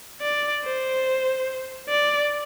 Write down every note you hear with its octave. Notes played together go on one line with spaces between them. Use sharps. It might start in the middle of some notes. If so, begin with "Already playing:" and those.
D5
C5
D5